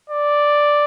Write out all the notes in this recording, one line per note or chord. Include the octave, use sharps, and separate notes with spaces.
D5